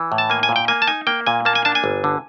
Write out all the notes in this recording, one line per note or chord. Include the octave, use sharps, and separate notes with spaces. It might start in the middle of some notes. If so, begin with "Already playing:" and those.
Already playing: E3
A2
A5
A#3 G#5
G#5
A#2
G5
A#3 G#5
A5
D#4 G#5
A#3 G5
A#2 G#5
A#3 A5
G#5
D4 A5
G#5
G1
D3